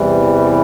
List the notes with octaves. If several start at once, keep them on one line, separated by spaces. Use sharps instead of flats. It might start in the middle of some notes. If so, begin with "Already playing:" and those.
Already playing: E2 C3 E3 G3